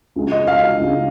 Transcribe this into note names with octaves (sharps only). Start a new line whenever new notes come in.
C#2 C#3 G#3
D#5
F5
F5
C#2 C#3 G#3